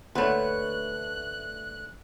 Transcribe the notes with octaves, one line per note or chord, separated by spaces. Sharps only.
D2 A3 A#3 B4 C#5 F#5 C6 F#6